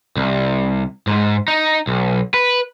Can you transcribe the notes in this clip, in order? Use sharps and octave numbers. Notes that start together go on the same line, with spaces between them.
C2
G#2
D#4
B1
B4